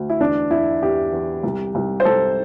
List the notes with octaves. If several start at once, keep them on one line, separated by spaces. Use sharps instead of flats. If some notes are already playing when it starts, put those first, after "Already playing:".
Already playing: D2
E4
E2 D4
E2 E4
E2 G4
E2
C2
C2
C5
C2 A4